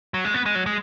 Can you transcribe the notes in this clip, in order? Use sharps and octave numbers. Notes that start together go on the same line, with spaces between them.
F#3
G#3
B3
G#3
F#3
G#3